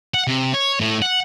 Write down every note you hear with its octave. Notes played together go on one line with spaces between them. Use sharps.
F#5
C3
C#5
A2
F#5